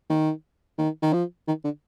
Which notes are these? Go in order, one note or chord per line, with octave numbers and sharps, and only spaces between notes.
D#3
D#3
D#3
F3
D#3
D3